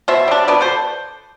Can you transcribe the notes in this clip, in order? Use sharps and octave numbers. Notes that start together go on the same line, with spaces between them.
B2 C5 E5
G3 D4
B2 B4 D5
A4 C5